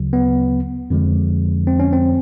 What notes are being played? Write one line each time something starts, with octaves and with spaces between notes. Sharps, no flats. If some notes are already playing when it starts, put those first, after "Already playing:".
Already playing: D2 C#3 F#3
B3
F2 D3 F3 G#3
C4
C#4
C4